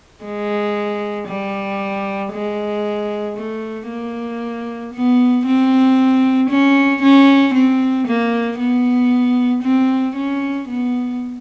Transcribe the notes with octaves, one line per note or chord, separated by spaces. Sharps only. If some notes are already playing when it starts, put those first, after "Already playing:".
G#3
G3
G#3
A3
A#3
B3
C4
C#4
C#4
C4
A#3
B3
C4
C#4
B3